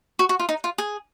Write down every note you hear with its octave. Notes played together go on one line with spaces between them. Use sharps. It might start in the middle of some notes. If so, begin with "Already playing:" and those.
F#4
F#4
F4
D#4
F4
G#4